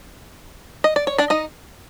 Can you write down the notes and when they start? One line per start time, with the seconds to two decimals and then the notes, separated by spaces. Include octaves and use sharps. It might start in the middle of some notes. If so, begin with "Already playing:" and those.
0.84 D#5
0.96 D5
1.07 C#5
1.18 D4 D5
1.30 D#4 D#5